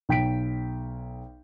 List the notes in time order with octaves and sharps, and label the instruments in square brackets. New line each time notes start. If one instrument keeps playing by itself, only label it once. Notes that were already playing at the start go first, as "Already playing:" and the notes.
[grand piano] B1 G5 B6 D7